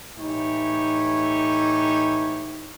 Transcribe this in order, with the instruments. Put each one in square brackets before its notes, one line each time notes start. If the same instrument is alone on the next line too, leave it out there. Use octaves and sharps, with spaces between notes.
[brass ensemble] A2 E3 D#4 G4 C#5